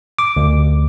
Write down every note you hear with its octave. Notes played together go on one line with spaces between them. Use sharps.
D6
D2